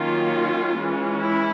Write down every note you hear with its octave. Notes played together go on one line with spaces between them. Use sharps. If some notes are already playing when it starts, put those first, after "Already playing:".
Already playing: D#3 F#3 A#3 C#4 F4
E3 G#3 C#4
E4